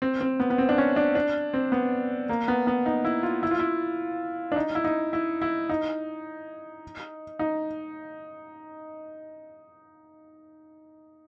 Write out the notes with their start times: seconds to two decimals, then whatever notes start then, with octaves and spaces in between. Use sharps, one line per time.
0.02 C4
0.21 C4
0.40 B3
0.50 B3
0.58 C4
0.69 D4
0.78 C#4
0.96 D4
1.15 D4
1.54 C4
1.72 B3
2.29 A#3
2.48 B3
2.67 B3
2.86 D#4
3.05 E4
3.23 F4
3.43 E4
3.51 F4
3.59 E4
4.52 D4
4.56 D#4
4.75 E4
4.84 D#4
5.13 E4
5.42 E4
5.69 D#4
7.39 D#4